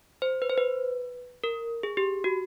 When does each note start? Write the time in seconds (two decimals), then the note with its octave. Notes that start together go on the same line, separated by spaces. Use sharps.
0.22 C5
0.42 B4
0.50 C5
0.58 B4
1.44 A#4
1.83 G#4
1.97 G4
2.24 F#4